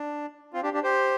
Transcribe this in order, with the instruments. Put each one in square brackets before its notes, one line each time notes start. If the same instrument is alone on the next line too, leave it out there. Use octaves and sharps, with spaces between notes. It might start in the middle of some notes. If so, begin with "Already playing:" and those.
Already playing: [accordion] D4
C4 F4
D4 G4
D4 G4
G4 C5